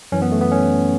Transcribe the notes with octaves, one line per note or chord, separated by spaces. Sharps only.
F#2 E3 C#4
B3
A3
B3
C#4